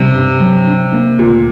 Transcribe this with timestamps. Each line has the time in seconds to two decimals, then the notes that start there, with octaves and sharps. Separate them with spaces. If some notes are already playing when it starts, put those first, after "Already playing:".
Already playing: C3 G3
0.15 G2
0.41 F#3
0.67 D4
0.93 A#3
1.19 D2 A#2